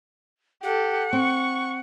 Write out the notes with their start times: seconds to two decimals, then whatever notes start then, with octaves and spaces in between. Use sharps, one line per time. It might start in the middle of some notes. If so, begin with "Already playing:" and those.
0.64 G4 A4 F#5
1.13 C4 C#6